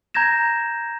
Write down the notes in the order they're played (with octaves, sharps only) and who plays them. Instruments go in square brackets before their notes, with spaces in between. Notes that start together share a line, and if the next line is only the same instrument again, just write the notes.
[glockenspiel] A#5 G6 G#6 A#6 E7